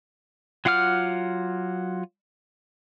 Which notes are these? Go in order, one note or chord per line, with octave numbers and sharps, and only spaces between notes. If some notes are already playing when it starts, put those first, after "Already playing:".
F#3 F4 F#5 D6 F6